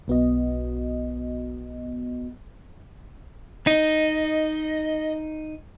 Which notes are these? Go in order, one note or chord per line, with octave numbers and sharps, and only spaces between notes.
B1 B3 F#4 D#5
D#4 D#5